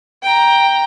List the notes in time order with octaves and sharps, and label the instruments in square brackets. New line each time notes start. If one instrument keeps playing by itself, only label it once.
[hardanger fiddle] G5 A#5